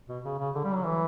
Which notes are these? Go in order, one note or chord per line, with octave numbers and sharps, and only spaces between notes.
B2
C#3
C#3
D3
G3
F#3
E3